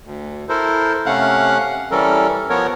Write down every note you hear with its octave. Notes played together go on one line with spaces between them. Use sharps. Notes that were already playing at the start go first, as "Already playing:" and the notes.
D2
E4 A4 A#4 C5
C3 A3 C#4 F5 F#5 F#6
E3 G3 C#4 A4 A#4
F3 B3 A#4 C#5